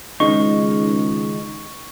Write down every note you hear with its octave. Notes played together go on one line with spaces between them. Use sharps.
C#2 D#3 G#3 D#4 C#6